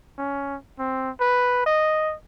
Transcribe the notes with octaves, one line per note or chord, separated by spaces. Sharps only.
C#4
C4
B4
D#5